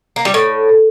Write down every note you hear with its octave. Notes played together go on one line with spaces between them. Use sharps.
A#3
G3
A2